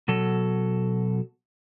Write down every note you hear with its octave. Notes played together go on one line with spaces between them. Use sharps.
B2 F#3 A4